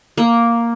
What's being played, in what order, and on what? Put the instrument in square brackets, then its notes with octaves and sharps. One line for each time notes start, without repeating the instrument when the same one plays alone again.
[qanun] A#3